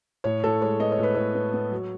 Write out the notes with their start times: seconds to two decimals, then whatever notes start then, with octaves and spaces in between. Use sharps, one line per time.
0.24 A2 C#5
0.44 A2 A4
0.62 G#3 C#5
0.80 B3 D#5
0.92 C#5
0.99 A2 B4
1.15 A2 C#5
1.35 B3
1.54 B3
1.71 F#3